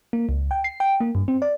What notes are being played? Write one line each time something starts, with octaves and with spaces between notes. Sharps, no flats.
A#3
C#2
G5
C7
G5
A#3
G2
C4
D5